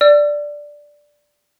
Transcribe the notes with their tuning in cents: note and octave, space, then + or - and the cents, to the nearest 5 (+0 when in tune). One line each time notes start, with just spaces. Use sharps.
D5 +0 E6 +45